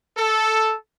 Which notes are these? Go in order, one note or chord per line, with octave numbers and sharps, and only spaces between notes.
A4